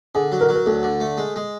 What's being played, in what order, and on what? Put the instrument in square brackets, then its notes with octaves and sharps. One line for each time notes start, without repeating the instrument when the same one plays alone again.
[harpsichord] D3 [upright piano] G#4
[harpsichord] F#3
[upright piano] A#4
[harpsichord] F#3
[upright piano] A#4
[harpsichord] D2 [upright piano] A4
[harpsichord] D3
A3
G#3
G#3